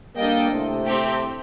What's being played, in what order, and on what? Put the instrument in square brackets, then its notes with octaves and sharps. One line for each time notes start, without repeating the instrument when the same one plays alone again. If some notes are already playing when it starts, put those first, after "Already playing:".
[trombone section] G3 A#3 [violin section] D4 A4 D#5 G5
[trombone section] A2 C3
[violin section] A3 C4 G4